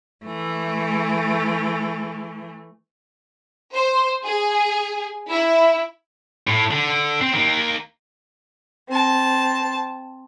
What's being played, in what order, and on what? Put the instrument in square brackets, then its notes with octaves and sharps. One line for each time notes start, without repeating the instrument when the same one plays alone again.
[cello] E3 A3
[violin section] C5
G#4
E4
[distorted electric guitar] A2
D3
C4
D#3 A#3
[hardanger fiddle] C4 A5